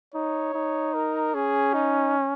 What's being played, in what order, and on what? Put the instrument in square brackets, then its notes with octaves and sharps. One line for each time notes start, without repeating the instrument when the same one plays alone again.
[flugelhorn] D#4 [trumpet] C#5
[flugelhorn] D#4
[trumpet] A#4
[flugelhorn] C#4 [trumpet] G#4
[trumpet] D#4